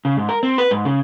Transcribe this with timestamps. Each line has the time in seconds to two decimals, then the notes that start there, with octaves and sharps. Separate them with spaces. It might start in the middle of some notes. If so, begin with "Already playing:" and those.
0.05 C#3
0.17 G#2
0.29 A#4
0.43 C4
0.58 B4
0.71 G#2
0.85 C#3